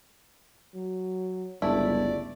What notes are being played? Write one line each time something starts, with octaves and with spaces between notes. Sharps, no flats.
F#3
G1 C#2 A3 E4 D5